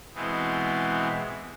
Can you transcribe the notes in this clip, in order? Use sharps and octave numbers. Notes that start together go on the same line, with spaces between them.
B2 E3 G#3 B3 C4